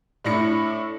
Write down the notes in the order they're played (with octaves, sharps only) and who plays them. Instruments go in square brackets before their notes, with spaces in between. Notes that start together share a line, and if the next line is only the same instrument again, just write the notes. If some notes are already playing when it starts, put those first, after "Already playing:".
[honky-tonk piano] A2 D4 E4 A#6 C#7